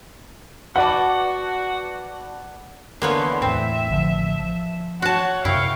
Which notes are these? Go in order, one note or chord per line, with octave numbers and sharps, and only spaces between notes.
F#4 B4 D5 F#5 A5
D3 E3 A#3 B3 C#5 C6
E2 A2 C4 E5
A1 D3 F3
F3
F#4 C#5 F#5 A5
F#2 C3 E4 F5 G5 C#6